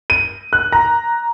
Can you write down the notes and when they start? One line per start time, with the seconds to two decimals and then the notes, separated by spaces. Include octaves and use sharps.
0.10 D#7
0.53 F#6
0.72 A#5